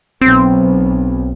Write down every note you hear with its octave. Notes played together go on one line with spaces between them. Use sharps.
B1 C4